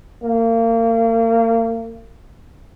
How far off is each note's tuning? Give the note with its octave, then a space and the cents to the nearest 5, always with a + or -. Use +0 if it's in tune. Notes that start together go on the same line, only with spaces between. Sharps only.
A#3 -35